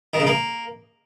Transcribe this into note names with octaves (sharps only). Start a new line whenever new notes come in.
D#3
C#3
A#3